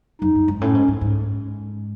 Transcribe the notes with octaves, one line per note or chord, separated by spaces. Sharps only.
F#2 D#4
F#2
G#2
A2 C#4
G#2
G#2
G#2